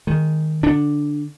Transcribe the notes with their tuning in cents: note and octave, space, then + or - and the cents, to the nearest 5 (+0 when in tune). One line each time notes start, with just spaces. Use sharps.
D#3 +0 G#3 +0
D3 +0 D4 +0